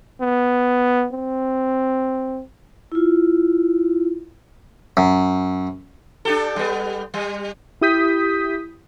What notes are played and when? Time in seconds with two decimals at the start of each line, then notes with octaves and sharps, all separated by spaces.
0.21 B3
1.13 C4
2.92 E4 F4
4.97 F#2
6.25 D4 G4 A4
6.56 G3 B3
7.14 G3
7.81 E4 G4 D#6 G6 B6